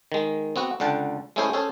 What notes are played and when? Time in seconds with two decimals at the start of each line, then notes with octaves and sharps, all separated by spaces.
0.12 D#3 G#3
0.56 B3 C4 F#4 F#5
0.80 C#2 D3 F#5 G5 A5
1.36 G#3 A3 C#4 E4 G#4 C5
1.53 C#4 G#4 A4 C5